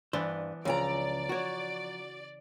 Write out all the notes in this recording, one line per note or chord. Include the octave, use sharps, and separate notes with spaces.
G2 E3 B3 D4 C5
C#2 C#3 F3 D5 G#5 A#5
F#4 C#5